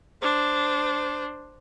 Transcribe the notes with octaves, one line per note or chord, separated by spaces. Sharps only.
D4 C5